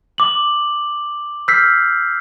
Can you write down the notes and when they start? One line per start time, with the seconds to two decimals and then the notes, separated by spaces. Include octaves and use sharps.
0.18 D6 F#7
1.48 E6 F6 G6 B6 C7